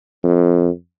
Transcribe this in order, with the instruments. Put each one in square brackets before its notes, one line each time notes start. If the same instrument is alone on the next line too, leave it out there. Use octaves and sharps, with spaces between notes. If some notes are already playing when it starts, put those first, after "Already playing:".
[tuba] F2